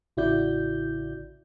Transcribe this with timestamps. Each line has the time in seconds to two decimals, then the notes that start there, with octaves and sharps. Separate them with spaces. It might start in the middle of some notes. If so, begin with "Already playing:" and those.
0.17 A1 C#3 E4 F#4 D5 G6